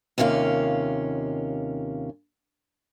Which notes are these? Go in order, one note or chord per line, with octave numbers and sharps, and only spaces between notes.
D#2 C3 A#3 C#4 F4